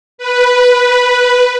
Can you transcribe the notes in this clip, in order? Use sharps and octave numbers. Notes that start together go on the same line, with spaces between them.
B4